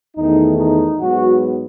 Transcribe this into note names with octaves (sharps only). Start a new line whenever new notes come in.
E2 D#3 A3 D#4
D#4
G#2 F#3 B3 F#4